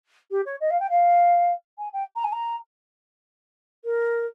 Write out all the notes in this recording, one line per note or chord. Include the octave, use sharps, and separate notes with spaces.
G4
C#5
D#5
F5
G5
F5
G#5
G5
A#5
G#5
A#5
A#4